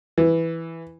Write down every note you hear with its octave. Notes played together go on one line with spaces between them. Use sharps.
E3